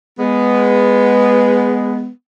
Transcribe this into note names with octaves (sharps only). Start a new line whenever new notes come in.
G#3 B3